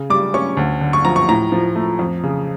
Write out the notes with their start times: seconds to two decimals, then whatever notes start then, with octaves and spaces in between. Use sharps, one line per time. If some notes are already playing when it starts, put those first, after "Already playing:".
Already playing: C#3
0.10 G3 D6
0.34 C#4 C#6
0.57 D2
0.81 D3
0.93 C#6
1.05 F3 A#5
1.16 C#6
1.29 A2 A#5
1.52 F3
1.76 A3
1.99 F2
2.23 C#3